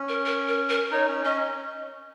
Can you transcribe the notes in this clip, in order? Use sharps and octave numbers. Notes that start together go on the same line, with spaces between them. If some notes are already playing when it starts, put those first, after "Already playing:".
Already playing: C#4
A#4
A#4
A#4
A#4
D#4 C#5
C#4
C#4 D#5